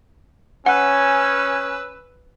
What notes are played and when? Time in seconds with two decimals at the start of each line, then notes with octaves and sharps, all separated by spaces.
0.66 C#4 B4 F#5 G#5 E6